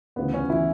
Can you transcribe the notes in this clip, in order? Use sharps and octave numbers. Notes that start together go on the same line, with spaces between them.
D2 C#3 E3 B3
C#4
E3 E4